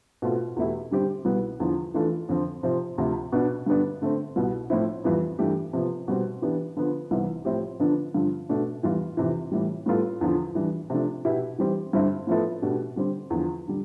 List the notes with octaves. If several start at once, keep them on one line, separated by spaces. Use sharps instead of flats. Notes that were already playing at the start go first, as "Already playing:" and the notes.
B2 A3 C4 F4
E2 B2 A3 E4 G4
D3 G3 C4 G4
C2 B2 G3 B3
E2 D3 F3
E3 A3 D4 F4 A4
F2 D3 F3 C4
C3 F3 C4
D2 C3 F3 C4
B2 B3 D4
G2 D3 G3 B3 D4
D3 A3 C4
C2 B2 B3
A2 F3 C4 E4
F2 E3 G3 B3 F4
G2 E3 A3 D4 G4
C3 F3 B3
B2 G3 C4
E3 B3 D4 G4
D3 F3 B3
C2 C3 E3 G3 B3
A2 F3 C4 E4 G4
D3 F3 B3 D4
G2 D3 F3
B2 A3 D4
F2 E3 G3 B3 F4
F2 C3 E3
A2 E3 G3
A2 G3 B3 F4 A4
E2 D3 F3
E3 G3 D4
C3 F3 A3 D4
B2 B3 E4 G4
E3 G3 C4 G4
G2 D3 G3 C4 E4
A2 F3 B3 E4 A4
B2 A3 D4 G4
D3 G3 C4
E2 D3 F3
D3 G3